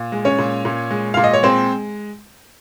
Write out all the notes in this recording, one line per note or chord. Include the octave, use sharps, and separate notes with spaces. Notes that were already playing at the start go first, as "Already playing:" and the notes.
Already playing: A#2
G#3
C#4 C#5
A#2
A#2
G#3
A#2 F5
D#5
C#5
G#3 C4 C5